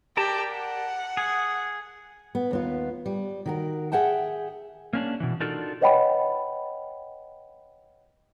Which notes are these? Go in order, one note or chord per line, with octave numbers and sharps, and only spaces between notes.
G4 A#4 D5 A5
F#5
G#4
B3
D#2 B3 F4
G3
D#3 F#4 A#4
G#4 E5 F#5 G5 A5
A#3 C#4 D4
B2 E3
D4 D#4 F4 F#4 A4 A#4
B4 C#5 D#5 F#5 G5 B5